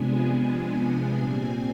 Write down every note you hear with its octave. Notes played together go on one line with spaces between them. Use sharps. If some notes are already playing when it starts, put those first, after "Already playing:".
Already playing: C3 F3 G#3 B3 D4 G#5
G#5
A#2 G3 C4